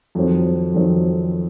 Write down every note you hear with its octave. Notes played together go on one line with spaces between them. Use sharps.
F2 D#3 F#3 C4
F2 D#3 F#3 C4